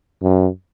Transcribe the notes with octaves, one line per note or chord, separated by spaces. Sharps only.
F#2